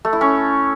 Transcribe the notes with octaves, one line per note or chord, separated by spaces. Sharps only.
A3
E4
C#4